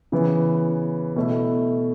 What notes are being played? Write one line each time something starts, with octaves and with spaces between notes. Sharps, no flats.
C#3 E3 B3
B2 A3 E4